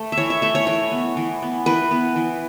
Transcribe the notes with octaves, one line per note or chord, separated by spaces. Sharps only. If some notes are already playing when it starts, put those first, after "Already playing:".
Already playing: A3
E5
E3 C#5
E5
A3 E5
C#5
E3 C#5
B3
E3
B3
E3 B4
B3
E3